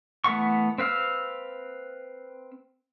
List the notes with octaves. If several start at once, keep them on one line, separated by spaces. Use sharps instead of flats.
E3 A3 B3 F#5 C#6
C4 B4 F5 E6